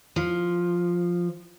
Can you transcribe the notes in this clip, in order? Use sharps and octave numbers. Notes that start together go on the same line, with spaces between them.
F3